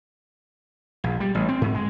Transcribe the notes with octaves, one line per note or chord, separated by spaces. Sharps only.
A#1
G3
A1
C4
G#2
G#3